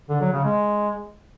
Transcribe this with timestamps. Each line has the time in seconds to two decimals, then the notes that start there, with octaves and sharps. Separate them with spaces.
0.10 D3
0.21 F#3
0.33 C#3
0.45 G#3